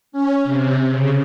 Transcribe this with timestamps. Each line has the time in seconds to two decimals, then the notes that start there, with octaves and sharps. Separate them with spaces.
0.12 C#4
0.44 C3
0.89 C#3